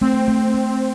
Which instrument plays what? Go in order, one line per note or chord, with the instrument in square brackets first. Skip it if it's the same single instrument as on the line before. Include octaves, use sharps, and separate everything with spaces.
[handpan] A3 [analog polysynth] C4
[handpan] A3
A3